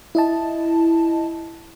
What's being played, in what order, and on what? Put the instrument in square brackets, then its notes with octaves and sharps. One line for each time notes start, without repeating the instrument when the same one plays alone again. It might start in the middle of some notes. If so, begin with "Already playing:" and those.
[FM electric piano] E4 D#5 A5